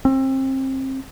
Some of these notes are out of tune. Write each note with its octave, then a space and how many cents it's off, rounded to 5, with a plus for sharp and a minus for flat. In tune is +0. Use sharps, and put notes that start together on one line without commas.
C4 +30